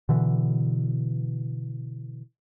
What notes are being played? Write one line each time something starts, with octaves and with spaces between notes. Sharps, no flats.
B2 D3 E3